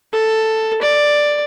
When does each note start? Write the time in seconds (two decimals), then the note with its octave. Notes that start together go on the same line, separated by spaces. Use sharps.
0.13 A4
0.82 D5